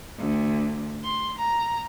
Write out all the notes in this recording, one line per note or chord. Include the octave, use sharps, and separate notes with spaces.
D2
C6
A#5